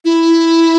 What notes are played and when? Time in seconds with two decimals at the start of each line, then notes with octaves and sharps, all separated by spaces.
0.05 E4